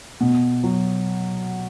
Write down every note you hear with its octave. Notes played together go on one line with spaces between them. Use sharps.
B2
F#3